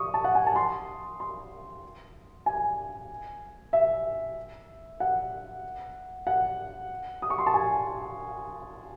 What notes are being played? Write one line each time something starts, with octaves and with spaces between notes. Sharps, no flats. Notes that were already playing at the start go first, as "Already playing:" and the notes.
Already playing: C#6 D#6
A5
F#5
G#5
A5
C6
C6
G#5
E5
F#5
F#5
D#6
C#6
C6
A5
G#5